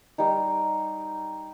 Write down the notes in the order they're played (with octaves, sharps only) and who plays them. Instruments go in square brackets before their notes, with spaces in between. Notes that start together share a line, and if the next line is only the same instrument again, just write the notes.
[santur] G3 D#4